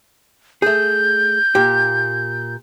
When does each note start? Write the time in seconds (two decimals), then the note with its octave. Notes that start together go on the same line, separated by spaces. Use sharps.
0.62 A3 G#4 G6
1.55 A#2 G4